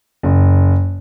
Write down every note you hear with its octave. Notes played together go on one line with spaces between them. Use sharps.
F#1